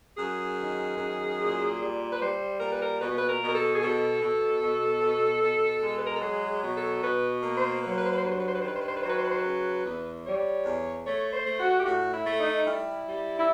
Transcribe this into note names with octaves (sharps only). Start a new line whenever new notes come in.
F#2 G#4
D#3
F#2
A#2
G3
B4
G3 C5
A#2 A#4
B4
A#4
B2 B4
B4
A#4
B2
A#4
A4
G#4
B2 A4
B2
B2
B2
B2
G#3
B4
A#4
A4
F#3 G#4
B2
A4
B2 B4
A#3
C5
F#3 B4
C5
B4
C5
B4
C5
G2 B4
C5
B4
C5
B4
C5
D#3 B4
C5
B4
C5
B4
F#3 C5
B4
C5
B4
C5
B4
C#3
E2
G3 C#5
E2
A3 C#5
C5
A3
F#4
G4
A2 F#4
E4
A3
D#4
G3 E4
G3
E4